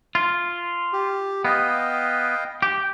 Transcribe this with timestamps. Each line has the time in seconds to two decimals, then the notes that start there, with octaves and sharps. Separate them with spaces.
0.15 F4
0.93 G4
1.45 B3 D#5 F5 G5
2.62 G4